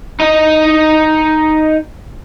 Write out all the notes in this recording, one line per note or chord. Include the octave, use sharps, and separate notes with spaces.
D#4 D#5